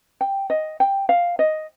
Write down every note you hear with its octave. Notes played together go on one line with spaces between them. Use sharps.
G5
D#5
G5
F5
D#5